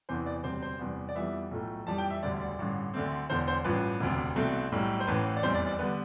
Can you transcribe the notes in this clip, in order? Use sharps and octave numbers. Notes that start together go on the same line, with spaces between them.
E2 C3 E3 B3 C5
D5
E1 D2 C3 G3 C4 C5
C5
E2 C3 G3 B3
D5
F2 E3 G3 B3 E5
B1 A2 F3 A3
F2 E3 G3 A5
G5
E5
E1 D2 D3 G3 D5
D5
A1 G2 D3
D2 D3 A3 C4
E1 E2 D3 C5
C5
A1 G2 F3 B4
E1 D2 C3
C2 B2 A3 C4
B1 A2 G3
C5
A1 A2 E3 B4
D5
F1 E2 C3 G3 C5
D5
D5
D3 G3 B3 B4